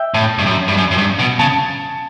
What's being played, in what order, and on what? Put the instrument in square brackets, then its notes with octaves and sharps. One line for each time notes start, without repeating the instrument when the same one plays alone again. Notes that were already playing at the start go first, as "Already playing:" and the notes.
Already playing: [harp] E5 G5
[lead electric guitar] A2 [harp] A5
[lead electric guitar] G2
F#2
G2
F#2
F#2
G2
B2
[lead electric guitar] C#3 [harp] A5